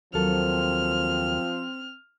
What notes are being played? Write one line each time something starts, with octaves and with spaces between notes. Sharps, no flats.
D#2 F3 F#3 C4 A4 F6